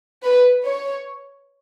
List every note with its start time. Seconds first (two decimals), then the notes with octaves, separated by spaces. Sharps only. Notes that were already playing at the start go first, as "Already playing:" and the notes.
0.23 B4
0.65 C#5